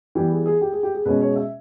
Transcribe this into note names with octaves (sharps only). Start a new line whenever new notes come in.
E3 G3 B3 G4
G#4
G#4
G4
G#4
G4
G#4
B2 G#3 C#4 B4
C#5
E5